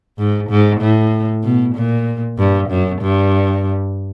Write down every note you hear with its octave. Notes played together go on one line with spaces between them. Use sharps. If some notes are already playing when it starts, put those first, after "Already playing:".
G#2
G#2
A2
B2
A#2
G2
F#2
G2